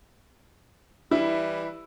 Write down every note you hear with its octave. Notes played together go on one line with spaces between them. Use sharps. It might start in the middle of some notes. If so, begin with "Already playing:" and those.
E3 G3 E4 B4